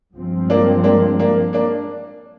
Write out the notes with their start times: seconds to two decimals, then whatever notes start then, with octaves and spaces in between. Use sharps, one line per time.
0.15 G2 F3 G#3 C4
0.50 A#3 D4
0.84 A#3 D4
1.19 A#3 D4
1.53 A#3 D4